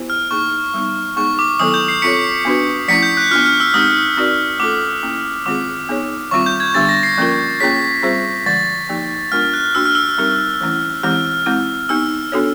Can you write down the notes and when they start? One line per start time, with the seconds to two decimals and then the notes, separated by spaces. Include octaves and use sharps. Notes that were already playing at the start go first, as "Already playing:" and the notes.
Already playing: B3 E4 G4 C5
0.10 F6
0.31 A#3 D#4 G#4 C#6
0.74 G3 B3 D#4
1.16 G#3 B3 D#4 G#4 C#6
1.39 D6
1.60 D#3 F#3 B3 E4 A4 D#6
1.74 G6
1.88 C7
2.02 C4 F4 A4 C#5 B6 C#7
2.45 B3 D4 F#4 B4
2.88 F3 A3 C#4 E4 B6 C#7
3.03 G6
3.17 F#6
3.31 B3 D4 F4 F6
3.45 F6
3.60 E6
3.74 G#3 C4 D#4 G4 D#6
4.17 C4 D#4 F#4 A#4 D5
4.59 A3 C#4 F4 A4 D6
5.03 A#3 C#4 E4
5.46 D#3 G#3 C4 F4 G#4 D6
5.89 B3 D#4 G#4 C#5
6.31 D#3 G3 C4 F4 C#6
6.46 G6
6.60 G#6
6.74 D3 G3 B3 D4 G4 A6
6.89 A#6
7.03 C7
7.17 F3 A#3 C#4 F4 A#4
7.60 A#3 C#4 F4 G#4 C#5 B6
8.03 G3 C4 F4 G#4 C5
8.46 D3 F3 G#3 A6
8.89 F3 A#3 D#4 G4
9.32 G#3 B3 D4 F4 A#4 F6
9.53 F#6
9.75 A#3 D4 F#4 E6
9.85 F6
9.95 E6
10.18 G3 C4 D#4 G4 A#4
10.61 E3 A3 C#4 E4
11.03 E3 G#3 C4 E4 G4 F6
11.46 G#3 C4 E4
11.89 B3 D#4 G4 E6
12.32 B3 D4 F#4 A4 C#5